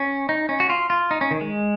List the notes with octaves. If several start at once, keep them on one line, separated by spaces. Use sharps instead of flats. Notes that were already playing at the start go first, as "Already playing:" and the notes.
Already playing: C#4
D#4
C#4
F#4
F4
F4
D#4
C#4
D#3
G#3